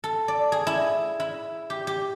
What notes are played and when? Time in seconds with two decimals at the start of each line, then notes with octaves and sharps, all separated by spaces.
0.04 A4
0.28 D5
0.52 G#4
0.67 E4
1.20 E4
1.70 G4
1.87 G4